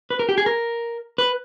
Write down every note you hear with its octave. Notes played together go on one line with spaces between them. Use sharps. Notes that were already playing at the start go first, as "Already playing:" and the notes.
B4
A#4
G4
G#4
A#4
B4